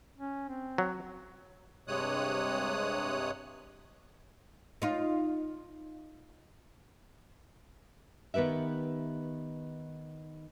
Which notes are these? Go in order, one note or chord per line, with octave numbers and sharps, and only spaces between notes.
C#4
C4
F#3
G2 C3 G#3 C#5 D#6 F#6
D#4 F4
D#3 B3 G4 B4 E5